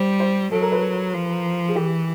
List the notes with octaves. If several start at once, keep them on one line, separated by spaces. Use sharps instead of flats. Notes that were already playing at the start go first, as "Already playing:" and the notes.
Already playing: G3 C5
C5
F#3 A4
A#4
B4
F3
G#4
E3 G4